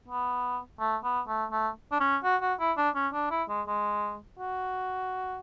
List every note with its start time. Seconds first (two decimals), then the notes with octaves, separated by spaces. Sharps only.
0.09 B3
0.80 A3
1.04 B3
1.28 A3
1.52 A3
1.92 D4
2.00 C#4
2.24 F#4
2.42 F#4
2.60 E4
2.77 D4
2.95 C#4
3.13 D4
3.31 E4
3.49 G#3
3.67 G#3
4.39 F#4